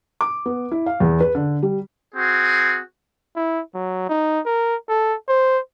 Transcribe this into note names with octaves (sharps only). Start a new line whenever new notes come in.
D6
B3
E4
F5
E2
B4
D3
G3
C4 F#4 G#4
E4
F#3
D#4
A#4
A4
C5